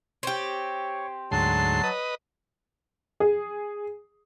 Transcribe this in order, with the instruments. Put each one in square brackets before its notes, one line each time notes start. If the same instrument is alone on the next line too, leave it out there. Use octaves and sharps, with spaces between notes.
[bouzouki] C4 G4 [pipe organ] C#5
[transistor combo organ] D2 G#2 C6 [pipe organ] F#3 [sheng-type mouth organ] A5
[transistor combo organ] B4 D#5
[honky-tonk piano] G#4